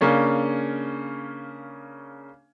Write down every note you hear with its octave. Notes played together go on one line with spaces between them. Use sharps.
C#3 A#3 C#4 D4